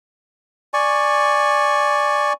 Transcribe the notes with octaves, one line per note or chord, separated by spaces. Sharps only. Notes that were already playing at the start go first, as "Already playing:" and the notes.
D5 G#5 C#6